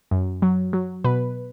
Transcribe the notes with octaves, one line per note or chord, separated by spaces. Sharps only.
F#2
F#3
F#3
B2 B4